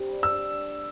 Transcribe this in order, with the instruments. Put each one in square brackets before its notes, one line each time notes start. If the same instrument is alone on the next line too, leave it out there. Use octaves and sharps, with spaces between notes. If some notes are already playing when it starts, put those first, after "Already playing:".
Already playing: [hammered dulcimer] C3 D4
G3
[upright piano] E6
[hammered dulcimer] D4